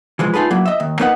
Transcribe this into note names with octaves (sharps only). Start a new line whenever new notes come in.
E3 F3 G#3
D#4 F4 G#4 A4 B4
F#3 A#3 E4
D#5 E5
D#2
A#3 D#4 A#4 B4 D#5 F#5